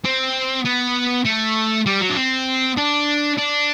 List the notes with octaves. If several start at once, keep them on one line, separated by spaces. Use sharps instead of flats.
C4
B3
A3
G3
F#3
D4
C4
D4
D4